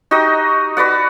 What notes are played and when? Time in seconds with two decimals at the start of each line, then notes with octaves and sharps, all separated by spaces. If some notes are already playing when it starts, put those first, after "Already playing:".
0.11 D#4 F#4 G4 D#5
0.77 F#4 B4 D5 F#5